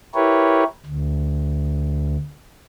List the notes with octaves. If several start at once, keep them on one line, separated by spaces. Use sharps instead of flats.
E4 G4 A#4 B4 C#5
D2